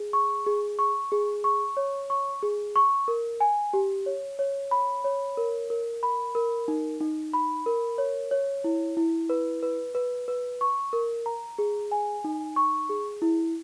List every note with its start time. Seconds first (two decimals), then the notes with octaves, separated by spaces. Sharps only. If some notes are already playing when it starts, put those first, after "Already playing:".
Already playing: G#4
0.13 C#6
0.47 G#4
0.79 C#6
1.12 G#4
1.44 C#6
1.77 C#5
2.10 C#6
2.43 G#4
2.76 C#6
3.08 A#4
3.40 G#5
3.73 G4
4.06 C#5
4.39 C#5
4.71 B5
5.04 C#5
5.37 A#4
5.70 A#4
6.03 B5
6.35 A#4
6.68 D#4
7.01 D#4
7.33 B5
7.66 A#4
7.98 C#5
8.31 C#5
8.64 E4
8.97 E4
9.30 B4
9.63 B4
9.95 B4
10.28 B4
10.61 C#6
10.93 A#4
11.26 A#5
11.58 G#4
11.92 G#5
12.24 D#4
12.56 C#6
12.89 G#4
13.22 E4